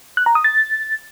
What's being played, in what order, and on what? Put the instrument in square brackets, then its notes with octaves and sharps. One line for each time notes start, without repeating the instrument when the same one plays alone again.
[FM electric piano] F#6
A#5
D#6
A6